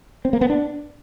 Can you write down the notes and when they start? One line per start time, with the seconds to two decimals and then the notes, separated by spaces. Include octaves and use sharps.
0.25 C4
0.33 A#3
0.41 B3
0.50 D4